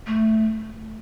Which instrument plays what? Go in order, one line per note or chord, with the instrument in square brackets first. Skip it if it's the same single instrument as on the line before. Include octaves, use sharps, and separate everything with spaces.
[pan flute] A3